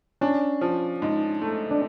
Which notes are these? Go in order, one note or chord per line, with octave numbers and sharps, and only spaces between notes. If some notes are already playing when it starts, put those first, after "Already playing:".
C#4 D4
F3
G#2
A3
D4